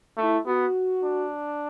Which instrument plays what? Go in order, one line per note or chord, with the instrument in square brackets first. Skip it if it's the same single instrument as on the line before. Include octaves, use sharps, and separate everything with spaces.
[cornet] A3 [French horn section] E4
[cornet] B3 [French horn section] F#4
[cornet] D4